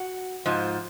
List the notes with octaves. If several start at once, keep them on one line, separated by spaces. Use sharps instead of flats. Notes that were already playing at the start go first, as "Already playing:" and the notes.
Already playing: F#4
G#2 F3